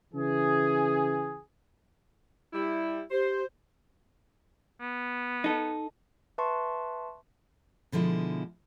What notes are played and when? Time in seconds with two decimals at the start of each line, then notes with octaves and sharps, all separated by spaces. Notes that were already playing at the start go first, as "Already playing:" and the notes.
0.14 C#3 E3 G#4
2.53 G3 E4
3.11 G4 C5
4.81 B3
5.44 D#4 A4
6.38 B4 E5 A5 C6 C#6
7.92 B2 D3 F3 G#3 E4